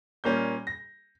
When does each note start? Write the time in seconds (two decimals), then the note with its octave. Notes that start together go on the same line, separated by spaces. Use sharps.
0.24 A#2 G3 A#3 C#4 G6
0.67 A#6